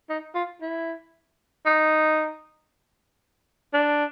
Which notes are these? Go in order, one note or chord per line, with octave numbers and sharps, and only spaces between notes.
D#4
F4
E4
D#4
D4